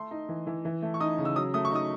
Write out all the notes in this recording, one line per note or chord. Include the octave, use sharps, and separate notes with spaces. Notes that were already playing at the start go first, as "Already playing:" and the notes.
Already playing: A3 C6
D#4
E3
E3
E3
A3
C#6
D#4 D#6
C#3
E6
F#3 D#6
A3 D#6
C#6
D#4 D#6